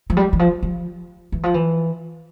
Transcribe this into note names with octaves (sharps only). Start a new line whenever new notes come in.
F3
G3
E3
F3
F3
E3
F3
E3